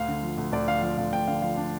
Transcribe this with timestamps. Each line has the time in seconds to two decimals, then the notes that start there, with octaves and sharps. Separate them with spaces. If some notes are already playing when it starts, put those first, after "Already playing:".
Already playing: D2 F5
0.08 D3
0.23 F3
0.37 D2
0.52 D2 D5
0.67 D3 F5
0.82 F3 F5
0.98 D2 F5
1.12 D2 G5
1.27 D3 F5
1.42 F3 F5
1.57 D4